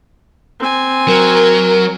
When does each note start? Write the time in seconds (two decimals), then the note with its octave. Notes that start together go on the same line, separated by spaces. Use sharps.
0.59 C4 G#5
1.08 F#3 A#4